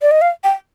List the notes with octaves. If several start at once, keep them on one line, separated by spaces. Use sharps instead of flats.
D5
D#5
F5
G5